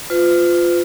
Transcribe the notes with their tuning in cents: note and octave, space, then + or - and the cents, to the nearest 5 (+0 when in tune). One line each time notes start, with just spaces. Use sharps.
F4 +0 B4 +45